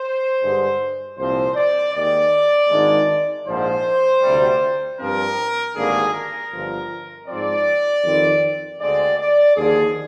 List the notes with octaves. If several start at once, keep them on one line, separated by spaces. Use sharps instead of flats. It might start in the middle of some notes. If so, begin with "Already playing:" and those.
Already playing: C5
G2 D3 G#3
C2 A#2 F3 C4 C5
D5
D#2 D#3 G#3 D5
G#1 G#2 D#3 G#3 D4
A#1 G#2 F3 C5
D2 C3 G3
G2 F3 C4 A#4
G#1 G2 D3 G3 A#3 G#4
A#4
G1 G2 F3
G#2 F3 C4 D5
F2 D#3 G3 C4
D2 D3 G#3 C4 D5
D5
D#2 D3 F3 G#4